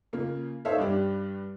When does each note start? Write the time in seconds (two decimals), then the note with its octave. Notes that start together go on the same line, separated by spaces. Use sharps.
0.13 C#3 A#3 F4
0.65 D#4 A4 C5 C#5 E5 F5
0.78 G2 G3 D4